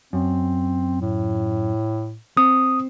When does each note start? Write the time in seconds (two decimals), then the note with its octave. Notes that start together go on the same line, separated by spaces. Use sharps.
0.13 F#2 C4
1.01 A2
2.37 C4 D#6